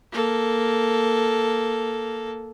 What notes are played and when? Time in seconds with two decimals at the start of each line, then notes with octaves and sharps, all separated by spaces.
0.12 A#3 A4